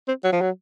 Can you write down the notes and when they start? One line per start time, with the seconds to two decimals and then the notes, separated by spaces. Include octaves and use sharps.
0.08 C4
0.24 F#3
0.32 F3
0.41 F#3